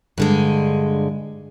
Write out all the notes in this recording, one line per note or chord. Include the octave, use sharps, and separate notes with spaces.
G2 D3 G#3